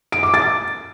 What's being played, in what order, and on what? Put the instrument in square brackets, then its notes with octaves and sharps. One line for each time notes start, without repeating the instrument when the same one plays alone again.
[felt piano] D7
D6
A6